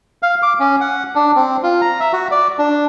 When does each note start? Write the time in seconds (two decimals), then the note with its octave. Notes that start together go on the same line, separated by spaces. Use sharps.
0.23 F5
0.42 D6
0.59 C#4
0.81 F#5
1.15 D4
1.36 C4
1.63 F4
1.81 A#5
2.00 E5
2.13 F#4
2.31 D5
2.59 D4